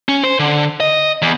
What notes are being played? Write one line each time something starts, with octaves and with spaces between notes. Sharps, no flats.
C#4
C5
D3
D#5
E2